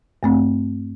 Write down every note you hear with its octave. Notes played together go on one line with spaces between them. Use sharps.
G2 A3 C4